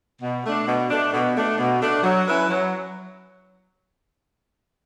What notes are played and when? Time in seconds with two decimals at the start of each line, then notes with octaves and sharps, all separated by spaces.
0.22 B2
0.45 A3 D4
0.67 B2
0.90 A3 D4
1.13 B2
1.36 A3 D4
1.59 B2
1.82 A3 D4
2.03 F#3
2.26 C#4 E4 B4
2.50 F#3